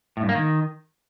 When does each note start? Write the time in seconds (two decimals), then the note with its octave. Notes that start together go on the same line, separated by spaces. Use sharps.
0.17 A2
0.23 G2
0.29 A#3
0.35 D#3